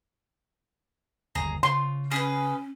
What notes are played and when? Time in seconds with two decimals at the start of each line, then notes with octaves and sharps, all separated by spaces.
1.35 G1 D#2 G#4 A#5
1.63 C#3 F4 C6
2.11 C#4 G#4 B4